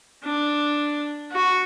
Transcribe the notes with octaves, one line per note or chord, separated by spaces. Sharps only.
D4
F#4